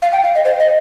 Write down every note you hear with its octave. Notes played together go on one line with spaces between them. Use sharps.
F5
G5
F5
D#5
C5
D#5